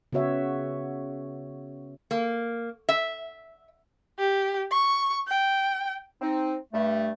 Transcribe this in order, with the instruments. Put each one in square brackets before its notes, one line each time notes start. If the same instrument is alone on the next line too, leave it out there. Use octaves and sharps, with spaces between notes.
[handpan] C#3 B3 F#4 C#5 E5
[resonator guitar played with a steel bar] A#3
E5
[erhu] G4
C#6
G5
[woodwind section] C4 D#4
G2 A3